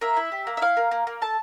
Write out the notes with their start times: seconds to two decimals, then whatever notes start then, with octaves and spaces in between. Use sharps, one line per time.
0.01 A#3 E5
0.17 E4
0.32 G4
0.47 A#3
0.57 E5
0.62 E4 F5
0.77 A#3
0.91 A#3
1.07 A#3
1.22 A4 A5